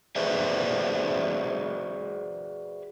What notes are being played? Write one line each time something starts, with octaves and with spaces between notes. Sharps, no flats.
F#4 G#4 B4 C5 D5 E5